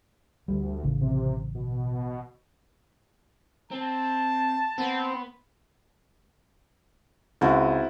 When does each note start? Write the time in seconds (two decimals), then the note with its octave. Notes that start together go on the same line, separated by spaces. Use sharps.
0.48 D2 G3
0.83 A1 C#3
1.01 C3
1.55 B2
3.72 C4 A5
4.78 B3 C4 B4
7.41 C#2 C4 E4 F#4